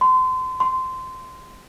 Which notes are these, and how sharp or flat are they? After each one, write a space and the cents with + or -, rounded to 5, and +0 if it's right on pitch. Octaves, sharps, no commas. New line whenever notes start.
C6 -30
C6 -15